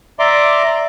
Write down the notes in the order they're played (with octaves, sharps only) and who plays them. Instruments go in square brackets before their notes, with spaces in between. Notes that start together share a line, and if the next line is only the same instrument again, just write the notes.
[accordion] D5 E5 A#5 C6 D6